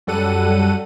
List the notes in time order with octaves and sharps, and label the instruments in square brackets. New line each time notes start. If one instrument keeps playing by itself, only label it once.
[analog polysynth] F#2 F#3 G3 A4 F#5 D#7